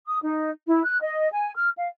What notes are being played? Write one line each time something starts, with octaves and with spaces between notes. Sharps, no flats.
D#6
D#4
E4
F#6
D#5
G#5
F6
F5